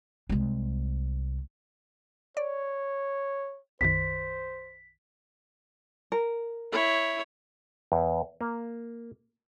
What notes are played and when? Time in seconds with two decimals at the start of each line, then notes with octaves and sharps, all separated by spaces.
0.29 C2 G#3
2.37 C#5 D5
3.81 B1 F#2 D#3 C5 B6
6.12 A#4
6.72 E4 C#5
7.92 E2
8.41 A#3